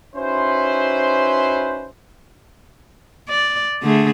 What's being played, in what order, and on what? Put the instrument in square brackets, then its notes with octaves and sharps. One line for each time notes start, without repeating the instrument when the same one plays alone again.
[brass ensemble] C#4 D#4 E4 F#4 B4 C5
[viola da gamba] D5
D3 A3 G#4